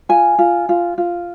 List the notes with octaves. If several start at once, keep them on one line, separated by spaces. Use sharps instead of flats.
F4 G#5
F4
F4
F4